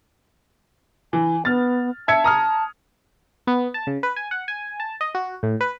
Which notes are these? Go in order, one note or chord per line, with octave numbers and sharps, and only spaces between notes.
E3 G#5
B3 F6 A6
E5 A5 G#6 C#7
A#5 D#6 F6
B3
A5
C#3
B4
G#5
F#5
G#5
A5
D#5
F#4
A2
B4